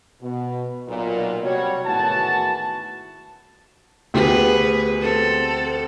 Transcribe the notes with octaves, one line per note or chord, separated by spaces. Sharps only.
B2
B1 A#2
C3 G3 F#4 C#5
G#1 A2 E3 B3 F#4 A5
D2 B3 G4 G#4 B4
C4 A4